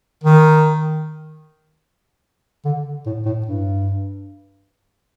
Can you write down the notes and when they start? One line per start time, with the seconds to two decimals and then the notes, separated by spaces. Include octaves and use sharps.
0.24 D#3
2.65 D3
3.06 A2
3.25 A2
3.46 G2